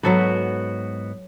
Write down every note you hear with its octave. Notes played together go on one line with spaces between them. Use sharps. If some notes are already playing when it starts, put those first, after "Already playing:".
G#2 F#3 B3 F#4 A4 B4